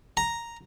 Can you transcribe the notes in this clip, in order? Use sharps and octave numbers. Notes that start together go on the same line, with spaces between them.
A#5